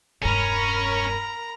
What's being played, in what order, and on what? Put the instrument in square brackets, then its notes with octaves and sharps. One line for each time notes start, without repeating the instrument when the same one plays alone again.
[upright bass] E1 G2 [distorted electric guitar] C#4 [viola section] A#4 B5 [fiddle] A#5